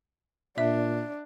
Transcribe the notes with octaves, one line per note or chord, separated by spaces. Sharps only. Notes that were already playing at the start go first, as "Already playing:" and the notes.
A#2 D4 E5